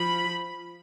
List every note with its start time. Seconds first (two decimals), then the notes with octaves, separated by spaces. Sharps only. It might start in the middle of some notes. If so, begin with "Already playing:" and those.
Already playing: F3 B5